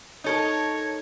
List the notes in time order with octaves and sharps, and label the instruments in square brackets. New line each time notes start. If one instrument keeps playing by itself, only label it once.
[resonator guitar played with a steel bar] D#4 A4 A#4 [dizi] C#5